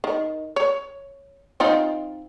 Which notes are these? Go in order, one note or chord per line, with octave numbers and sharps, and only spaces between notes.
D#3
C#5
C4 D#4 F4